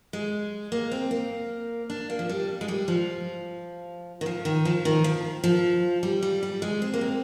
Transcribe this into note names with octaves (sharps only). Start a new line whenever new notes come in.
G#3
A#3
C4
A#3
D4
A#3
F3
G3
G#3
G3
F3
D#3
F3
D#3
F3
D#3
F3
F3
G3
G3
G3
G#3
C4
A#3
C4